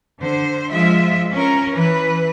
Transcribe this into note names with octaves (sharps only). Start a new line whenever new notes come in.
D3 C5
F3 G#3 F4 E5
C#4 A#4
E3 B4